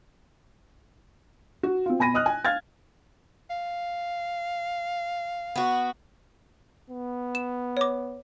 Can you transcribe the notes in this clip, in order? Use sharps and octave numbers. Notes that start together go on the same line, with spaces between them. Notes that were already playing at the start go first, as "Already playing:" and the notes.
F#4
C4 F4
B2 G#5 B5 A#6 D#7
D#5 D#6 F6 F#6
G#5
F5 F6 G#6 A6
F5
B3 F#4
B3
E7
C#5 D6